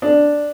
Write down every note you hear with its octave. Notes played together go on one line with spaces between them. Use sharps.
D4